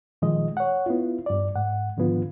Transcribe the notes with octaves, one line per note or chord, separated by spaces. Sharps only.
A#2 D#3 F3 G#3 D#5
C#5 F#5
B3 E4 F4
G2 D5
G#2 F#5
G#2 D3 D#3 F3 B3 F4